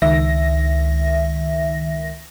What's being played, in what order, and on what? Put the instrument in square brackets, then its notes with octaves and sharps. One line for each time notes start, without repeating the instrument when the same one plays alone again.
[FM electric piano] C#2 D#3 E5 A#6